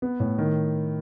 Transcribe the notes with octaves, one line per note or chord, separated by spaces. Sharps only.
B3
A2
D#3